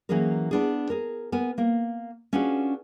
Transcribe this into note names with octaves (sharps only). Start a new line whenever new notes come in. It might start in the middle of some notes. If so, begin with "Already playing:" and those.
E3 F#3 A#3 C#4 G#4 A#4
B3 D4 G#4
G#4 A#4
B3 A#4 G#5
A#3 A#4
C#4 D4 F4 F#4 G#4 B4